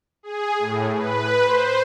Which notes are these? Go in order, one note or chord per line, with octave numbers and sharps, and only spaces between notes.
G#4
A2
B4
C5